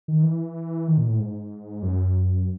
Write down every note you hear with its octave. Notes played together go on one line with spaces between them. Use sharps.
D#3
E3
D#3
A#2
A2
G#2
F#2